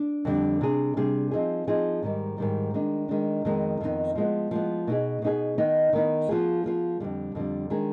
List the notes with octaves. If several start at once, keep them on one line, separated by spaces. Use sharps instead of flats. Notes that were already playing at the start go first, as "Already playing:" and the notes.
Already playing: D4
F2 D3 G3 D4
C3 G3 D4 G#4
C3 G3 D4 G#4
F3 C4 D#4 G#4
F3 C4 D#4 G#4
G#2 D#3 G3
G#2 D#3 G3
D#3 G#3 D4
D#3 G#3 D4
F2 D#3 G#3 B3 D#4
F2 D#3 G#3 B3 D#4
F3 G#3 B3
F3 G#3 B3
B2 B3 D#4 G#4
B2 B3 D#4 G#4
D#3 B3 D#4
D#3 B3 D#4
F3 B3 F4 G#4
F3 B3 F4 G#4
F2 D3 G3
F2 D3 G3
D#3 G#3 D4 G#4